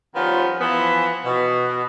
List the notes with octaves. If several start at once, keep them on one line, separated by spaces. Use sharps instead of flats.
D#3 F3 G3 B3 C#4 F4
E3 F3 B3
B2